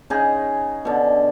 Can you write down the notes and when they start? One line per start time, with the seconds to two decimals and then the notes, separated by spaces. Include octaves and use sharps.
0.10 C#3 D#4 G#4
0.85 B2 D3